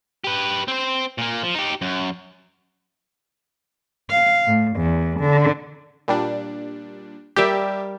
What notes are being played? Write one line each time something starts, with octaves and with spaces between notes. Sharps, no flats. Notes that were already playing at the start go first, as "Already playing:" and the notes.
G4 B4
C4 C5
A#2 A#3
F3
D#4 G4
F#2
F5
A2
E2
D3
A#2 G3 D4
G3 G4 A#4 D5 E5